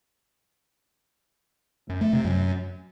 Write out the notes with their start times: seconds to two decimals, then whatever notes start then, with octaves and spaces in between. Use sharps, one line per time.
1.89 F#2
2.01 A3
2.13 C3
2.25 F#2